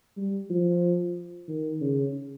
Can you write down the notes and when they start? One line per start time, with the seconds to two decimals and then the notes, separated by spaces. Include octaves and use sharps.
0.17 G3
0.50 F3
1.48 D#3
1.81 C#3